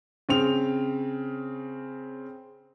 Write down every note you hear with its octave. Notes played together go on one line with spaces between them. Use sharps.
C#3 C4 F7